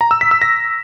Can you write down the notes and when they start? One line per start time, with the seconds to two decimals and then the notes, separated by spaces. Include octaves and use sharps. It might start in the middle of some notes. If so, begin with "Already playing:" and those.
0.01 A#5
0.11 E6
0.21 B6
0.31 E6
0.42 A#6